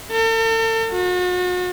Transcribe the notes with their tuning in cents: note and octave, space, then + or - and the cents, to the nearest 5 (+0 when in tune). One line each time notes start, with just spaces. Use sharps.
A4 +45
F#4 -40